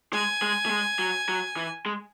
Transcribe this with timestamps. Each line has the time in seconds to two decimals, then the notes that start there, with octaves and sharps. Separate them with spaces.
0.13 G#3 G#5
0.42 G#3
0.66 A3
0.70 G#3
0.99 F#3
1.29 F#3
1.57 E3
1.86 G#3